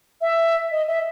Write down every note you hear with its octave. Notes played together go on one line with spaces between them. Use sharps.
E5
D#5
E5